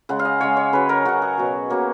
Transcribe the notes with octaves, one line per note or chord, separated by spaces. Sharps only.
C#3 G#3 F#5
F5
D#5
C#3 G#3 C#5
C#5
C#3 F#3 B4
A#4
C#3 F#3 F#4
G#4
B2 F#3
B2 F#3 A#3